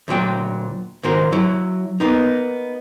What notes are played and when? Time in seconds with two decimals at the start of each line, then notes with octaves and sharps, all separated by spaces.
0.08 D2 A#2 F#3 G5
1.03 C#2 G#2 D#3 F#4 A#4 C5
1.32 F#3 E4
2.00 A#3 B3 D#4